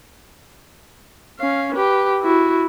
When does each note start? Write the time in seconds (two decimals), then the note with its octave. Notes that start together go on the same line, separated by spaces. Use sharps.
1.39 C#4 F5
1.74 G4 B4
2.22 E4 F#4